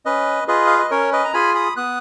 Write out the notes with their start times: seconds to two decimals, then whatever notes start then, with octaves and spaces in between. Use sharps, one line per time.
0.06 C#4 B4 D#5
0.48 F4 G#4 B4 D#5
0.67 F5
0.79 D#5
0.91 C#4 A#4 C#5
1.12 B4 D#5
1.25 A#5
1.34 F4 G#4 G#5 B5
1.55 B5 D#6
1.76 B3 D#6 F#6